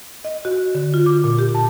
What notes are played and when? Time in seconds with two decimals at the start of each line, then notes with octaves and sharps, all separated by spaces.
0.24 D#5
0.45 F#4
0.75 D3
0.94 F4
1.06 D6
1.24 A#2
1.39 G4
1.55 A5